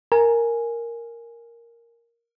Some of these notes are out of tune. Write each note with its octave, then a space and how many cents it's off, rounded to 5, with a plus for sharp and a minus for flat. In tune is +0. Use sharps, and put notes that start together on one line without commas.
A#4 +0 G#5 +0